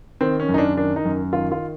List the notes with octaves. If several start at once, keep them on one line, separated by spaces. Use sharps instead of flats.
D#3 C4
C#4
F#2
D#4
D4
D#3 D4
D#4
F#2
D#3 F4
F4